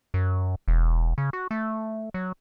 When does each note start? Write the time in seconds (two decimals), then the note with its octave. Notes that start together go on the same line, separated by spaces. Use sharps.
0.14 F#2
0.68 E1
1.18 C#3
1.33 F#4
1.51 A3
2.14 F#3